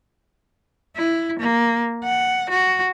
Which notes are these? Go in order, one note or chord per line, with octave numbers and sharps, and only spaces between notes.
E4
A#3
F#5
F#4